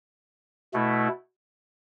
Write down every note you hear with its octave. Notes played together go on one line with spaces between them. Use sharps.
B2 A3 E4